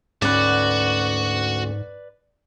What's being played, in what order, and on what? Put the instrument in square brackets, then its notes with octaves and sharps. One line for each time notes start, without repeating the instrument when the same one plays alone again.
[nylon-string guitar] D2 C#4 [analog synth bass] G#2 [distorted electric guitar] F#4 [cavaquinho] B4 D5